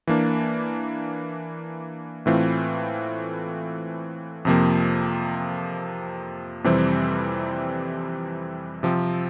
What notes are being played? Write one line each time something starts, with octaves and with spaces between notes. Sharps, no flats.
E3 A#3 D4
A2 E3 A3 C4 F4
F2 C3 F3 A#3
F2 C3 E3 G3 C4
C3 F3 C4